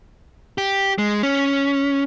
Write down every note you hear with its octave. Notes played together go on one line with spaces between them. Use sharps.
G4
G#3
C#4